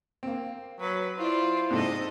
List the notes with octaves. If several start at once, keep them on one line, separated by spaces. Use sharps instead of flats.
A#3 C4
F#3 B4
E4 F4 C5 D5
G#2 C3 A4 D#5